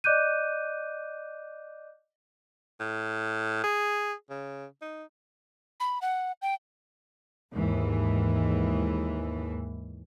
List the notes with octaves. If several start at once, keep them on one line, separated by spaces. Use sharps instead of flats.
D5 D#5 D6 F#6 G6 D#7
A2
G#4
C#3
D#4
B5
F#5
G5
D#2 G#2 E3